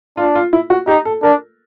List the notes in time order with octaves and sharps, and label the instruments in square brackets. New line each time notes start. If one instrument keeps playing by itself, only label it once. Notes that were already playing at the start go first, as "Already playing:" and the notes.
[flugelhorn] D4 [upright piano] F4
[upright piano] F4
E4
F#4
[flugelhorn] D#4 [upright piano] G4
[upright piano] A4
[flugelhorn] D4 [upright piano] A#4